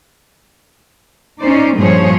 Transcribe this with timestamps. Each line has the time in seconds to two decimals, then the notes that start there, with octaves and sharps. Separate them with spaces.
1.41 C#4 D#4 C5 D5
1.77 G2 A#2 F3 G#4 C5 C#5